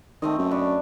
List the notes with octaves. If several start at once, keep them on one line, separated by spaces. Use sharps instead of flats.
D#3 A3 C4 D#5
F#2
D4 B5 C#6